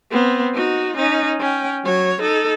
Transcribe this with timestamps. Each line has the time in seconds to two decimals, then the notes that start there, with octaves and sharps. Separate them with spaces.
0.11 B3 C4
0.54 D#4 F#4
0.97 C#4 D#4
1.40 C#4 G5
1.84 F#3 C#5
2.21 D#4 A4